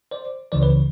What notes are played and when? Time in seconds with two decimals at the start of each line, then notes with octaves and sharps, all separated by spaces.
0.11 C5 D5
0.52 C#2 C#3 E3 C5 D5
0.62 B4 C#5